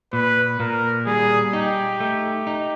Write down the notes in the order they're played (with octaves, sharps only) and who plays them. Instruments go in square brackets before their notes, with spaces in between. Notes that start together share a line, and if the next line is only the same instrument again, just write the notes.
[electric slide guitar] A#2 [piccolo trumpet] B4
[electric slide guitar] A#2 [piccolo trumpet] A#4
[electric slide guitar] G3 [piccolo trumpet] G#4
[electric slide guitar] D#4 [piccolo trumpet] G4
[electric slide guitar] A3
D#4